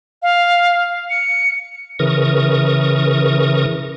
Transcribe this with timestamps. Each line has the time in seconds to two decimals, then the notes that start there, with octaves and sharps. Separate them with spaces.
0.22 F5
1.10 C#7
1.99 C#3 E3 A#4 C#6 D#6